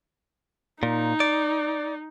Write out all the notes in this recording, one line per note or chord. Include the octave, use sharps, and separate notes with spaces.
A#2 D#4
D5